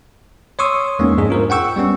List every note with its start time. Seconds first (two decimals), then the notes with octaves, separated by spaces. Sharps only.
0.59 C#5 C6 C#6 D#6 E6
0.99 E2 G#3 A#3 B3 C#4 D#4
1.18 F2 G#2 G#3 D4 G#4
1.30 F4 A#4 C5
1.50 F#5 G5 C#6 E6
1.76 G3 B3 C#4